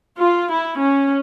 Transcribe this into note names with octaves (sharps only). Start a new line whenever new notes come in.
F4
E4
C#4